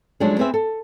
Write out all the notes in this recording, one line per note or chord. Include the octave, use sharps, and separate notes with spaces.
F3 F#3 G#3 A3 C#4 D4
B3 C4 G#4 B4 C5 E5
A4